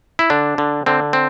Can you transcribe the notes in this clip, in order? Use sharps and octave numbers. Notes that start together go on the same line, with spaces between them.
E4
D3 D4
D3
D3 C4
C4